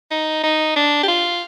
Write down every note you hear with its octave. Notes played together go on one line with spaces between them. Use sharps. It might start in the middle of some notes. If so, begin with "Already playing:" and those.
D#4
D#4
D4
G4
F4